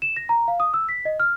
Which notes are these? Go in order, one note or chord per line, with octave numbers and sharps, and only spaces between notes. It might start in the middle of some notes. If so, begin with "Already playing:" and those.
E7
A#6
A#5
F5
D#6
E6
B6
D#5
F6